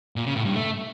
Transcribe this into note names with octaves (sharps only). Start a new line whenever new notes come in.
A#2
C#3
A2
G2
A3